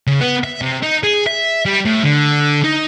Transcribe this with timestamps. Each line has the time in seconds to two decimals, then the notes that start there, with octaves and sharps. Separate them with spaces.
0.07 C#3
0.21 B3
0.44 E5
0.62 C3
0.83 D#4
1.03 G#4
1.27 E5
1.66 G3
1.85 A2
2.04 D3
2.64 D#4